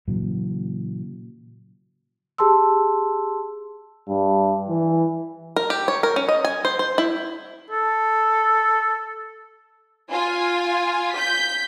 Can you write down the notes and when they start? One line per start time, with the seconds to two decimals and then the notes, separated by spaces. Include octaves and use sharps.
0.08 A#2 C#3 E3 F#3
2.38 G4 G#4 A5 C6 E6
4.08 G2
4.69 E3
5.56 A#4
5.70 G4
5.88 C#5
6.03 A#4
6.16 C#4
6.29 D#5
6.45 G#5
6.65 C5
6.79 C5
6.98 E4
7.71 A4
10.10 F4 G#5
11.13 G6 B6